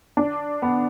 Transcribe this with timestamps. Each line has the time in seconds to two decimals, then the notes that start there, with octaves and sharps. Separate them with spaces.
0.17 D4
0.62 B3